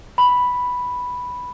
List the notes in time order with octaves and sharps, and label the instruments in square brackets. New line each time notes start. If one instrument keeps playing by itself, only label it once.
[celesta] B5